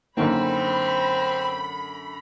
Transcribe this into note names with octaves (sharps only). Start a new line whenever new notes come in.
F#2 D3 A#3 C4 D#4 B5